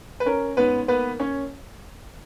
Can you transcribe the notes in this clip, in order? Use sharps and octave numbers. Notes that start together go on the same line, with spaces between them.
B4
C#4 A#4
G#2 B3 B4
A#3 B3 B4
C#4 C#5